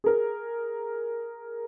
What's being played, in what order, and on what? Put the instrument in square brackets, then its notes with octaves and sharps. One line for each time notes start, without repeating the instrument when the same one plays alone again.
[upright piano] G#4 A#4